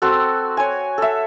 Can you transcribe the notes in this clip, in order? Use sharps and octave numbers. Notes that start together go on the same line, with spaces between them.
C4 F#4 A4
C#5 G#5
A4 E5